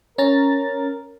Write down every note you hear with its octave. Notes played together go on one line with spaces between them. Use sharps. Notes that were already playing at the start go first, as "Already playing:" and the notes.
C#4 A#4 A#5 A6